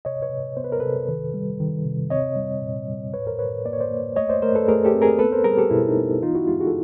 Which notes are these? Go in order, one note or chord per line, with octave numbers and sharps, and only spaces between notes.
C3 C#5 D#5
B4 C#5
C3
B3 C5
B4
A#4
C3 A4 B4
D#3
G3
D#3
C3
C4 C#5 D#5
G3
A#2
G3
A2 B4 C#5
A#4 C5
A2 B4 C#5
A#3 D5
C#5
C5 D5
A#3
A3 C#5 D#5
C5 D5
A3 A#4 C5
A4 B4
A3 G#4 A#4
G4 A4
C4
G#4 A#4
B3 A4 B4
A#4 C5
G3 G#4 A#4
G4 A4
B2 E4
D#4
B3
E3 D#4 F4
E4 F#4
G#3 F4 G4
F#4 G#4
A4